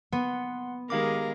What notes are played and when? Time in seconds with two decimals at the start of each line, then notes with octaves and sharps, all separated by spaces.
0.13 B3 F#5 C6
0.90 D#3 G#3 G4 A#4 F5 D6